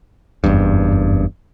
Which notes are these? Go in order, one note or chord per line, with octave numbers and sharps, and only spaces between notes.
F#1 E2 G2